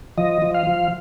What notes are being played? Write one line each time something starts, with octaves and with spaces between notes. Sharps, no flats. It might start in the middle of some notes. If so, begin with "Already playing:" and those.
F3 D#5
F3
F5
F3